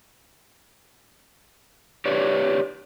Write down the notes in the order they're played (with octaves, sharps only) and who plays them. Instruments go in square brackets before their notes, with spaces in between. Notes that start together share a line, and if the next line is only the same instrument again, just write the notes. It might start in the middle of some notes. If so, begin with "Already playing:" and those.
[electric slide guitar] G4 B4 C#5 D5